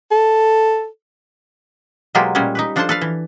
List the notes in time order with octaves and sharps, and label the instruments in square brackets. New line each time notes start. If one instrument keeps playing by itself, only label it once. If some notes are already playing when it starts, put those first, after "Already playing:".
[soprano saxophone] A4
[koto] B2 F#3 G#3 A#3 F4 G4
A#2 G3 G#3 C#4
D#4 G4 B4
F3 D4 F4 A4 C5 A5
A4 B4 F5
E3